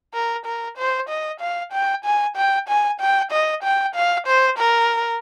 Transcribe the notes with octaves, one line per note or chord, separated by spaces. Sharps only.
A#4
A#4
C5
D#5
F5
G5
G#5
G5
G#5
G5
D#5
G5
F5
C5
A#4